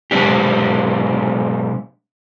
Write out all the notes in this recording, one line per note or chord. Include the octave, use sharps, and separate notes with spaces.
B2 F#3 G#3 C4 D4 G4